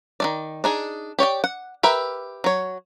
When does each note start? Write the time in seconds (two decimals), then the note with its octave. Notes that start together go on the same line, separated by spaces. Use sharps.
0.20 D#3 A3 D5
0.64 D4 D#4 G#4
1.19 G4 C#5 D5 G5
1.44 F#5
1.83 G4 A#4 B4 E5
2.44 F#3 C#5